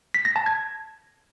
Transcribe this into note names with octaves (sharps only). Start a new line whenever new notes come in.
B6
A#6
A5
G#6